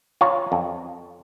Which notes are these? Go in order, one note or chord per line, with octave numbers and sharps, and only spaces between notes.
F4 C#5 A#5
F2